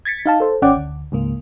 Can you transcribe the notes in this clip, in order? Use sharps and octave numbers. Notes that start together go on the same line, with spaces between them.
G#6 A6 B6 C#7
D#4 F5 A5
A4 C5
G#1 C#4 D5 F#5 G5 D6
D2
C#2 G#2 A#3